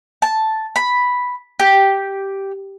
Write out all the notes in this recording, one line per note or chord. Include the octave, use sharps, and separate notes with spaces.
A5
B5
G4